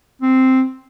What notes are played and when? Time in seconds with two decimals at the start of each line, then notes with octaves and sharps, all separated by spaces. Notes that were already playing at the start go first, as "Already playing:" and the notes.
0.22 C4